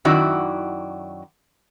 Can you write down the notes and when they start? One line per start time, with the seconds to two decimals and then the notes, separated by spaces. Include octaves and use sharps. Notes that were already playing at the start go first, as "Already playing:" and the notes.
0.05 F#2 D#3 E4 F#4 D5